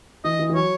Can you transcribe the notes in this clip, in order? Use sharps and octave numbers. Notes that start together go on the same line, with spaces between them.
E3 D#5
E3
E3
F#3 C#5